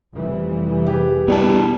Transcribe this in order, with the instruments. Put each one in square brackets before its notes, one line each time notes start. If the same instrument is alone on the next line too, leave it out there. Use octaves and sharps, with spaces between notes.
[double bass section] F1 E3 G3
[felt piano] G4 G#4 B4
[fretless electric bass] B2 G3 [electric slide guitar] B3 E4 A5